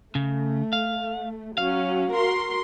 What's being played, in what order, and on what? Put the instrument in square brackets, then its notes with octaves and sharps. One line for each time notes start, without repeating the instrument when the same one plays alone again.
[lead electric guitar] C#3 [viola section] A3
[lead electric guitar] F5
[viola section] F#3 C#4 [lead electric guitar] F5
[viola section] F#4 A#4 C6